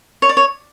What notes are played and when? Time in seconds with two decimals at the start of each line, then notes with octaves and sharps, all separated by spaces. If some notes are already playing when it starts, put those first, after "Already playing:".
0.22 C#5
0.29 D5
0.37 C#5